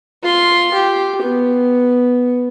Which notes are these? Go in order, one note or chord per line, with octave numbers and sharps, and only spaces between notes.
F4 C6
G4
B3